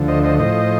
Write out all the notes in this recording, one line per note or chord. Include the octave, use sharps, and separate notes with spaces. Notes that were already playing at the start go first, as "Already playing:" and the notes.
Already playing: D2 D3 F3
C5 D#5
C5 D#5
A2 F3 C5 D#5